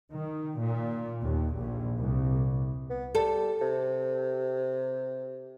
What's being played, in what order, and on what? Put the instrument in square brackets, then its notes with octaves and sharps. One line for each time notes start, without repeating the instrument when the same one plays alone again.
[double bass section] D#3
A#2
D#2
A#1
C2
[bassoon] B3
[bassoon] G3 [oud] A4
[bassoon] C3